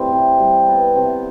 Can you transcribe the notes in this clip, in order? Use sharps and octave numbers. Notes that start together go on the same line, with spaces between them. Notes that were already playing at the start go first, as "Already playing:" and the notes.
Already playing: A2 E3 G3 C4
C3
G3
B3
C3